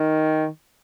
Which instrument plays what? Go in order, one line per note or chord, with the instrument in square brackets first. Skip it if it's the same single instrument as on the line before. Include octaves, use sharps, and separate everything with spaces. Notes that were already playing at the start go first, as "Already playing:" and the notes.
Already playing: [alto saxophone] D#3